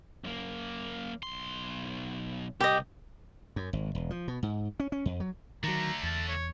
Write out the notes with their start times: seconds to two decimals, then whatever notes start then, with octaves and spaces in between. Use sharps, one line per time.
0.24 F#2 A#3
1.23 B1 C6
2.60 C2 G4 D#5
3.56 F#2
3.73 G#1
3.95 E1
4.10 F3
4.28 B2
4.43 G#2
4.80 C#4
4.92 C#4
5.06 F2
5.20 F#3
5.64 D3 D#3 F#3 A3 A#5
6.03 E2 A5
6.28 C#5